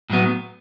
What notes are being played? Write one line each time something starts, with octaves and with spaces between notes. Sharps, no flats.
A2 F#3 B3